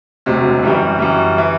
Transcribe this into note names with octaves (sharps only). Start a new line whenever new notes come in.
E1 D2 C3 F#3
F#2 E3 G3
F#2 E3 G3
E3